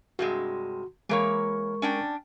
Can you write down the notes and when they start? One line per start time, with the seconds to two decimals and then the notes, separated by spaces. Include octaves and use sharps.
0.19 G2 C3 G#3 F#4
1.09 E3 G#3 A#3 A#4 C#5 C#6
1.82 C#4 D4 G5